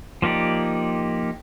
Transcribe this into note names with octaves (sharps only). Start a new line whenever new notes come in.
F3 A#3 D#4 G4 D5